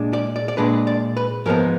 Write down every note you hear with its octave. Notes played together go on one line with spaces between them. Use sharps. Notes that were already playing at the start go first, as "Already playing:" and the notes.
Already playing: A#2 G#3 D4
D5
D5
D5
A#2 G#3 D4 B4
D5
B4
G#2 F3 G#3 B3 A#4